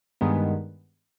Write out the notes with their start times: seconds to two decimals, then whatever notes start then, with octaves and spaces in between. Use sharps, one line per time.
0.21 G2 D#3 G#3 B3